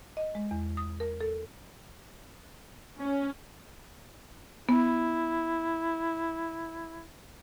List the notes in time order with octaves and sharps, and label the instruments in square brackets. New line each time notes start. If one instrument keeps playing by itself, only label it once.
[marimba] D#5
G#3
E2
D#6
A#4
A4
[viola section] C#4
[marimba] B3 [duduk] E4